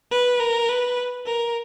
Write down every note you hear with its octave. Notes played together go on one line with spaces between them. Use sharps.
B4
A#4
B4
A#4